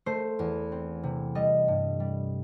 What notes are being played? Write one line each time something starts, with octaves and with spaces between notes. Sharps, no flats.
A3 C5
E2
C4
C3
G3 D#5
G2
G3